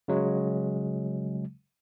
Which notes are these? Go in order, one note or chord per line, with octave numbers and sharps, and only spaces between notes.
C#3 F#3 G#3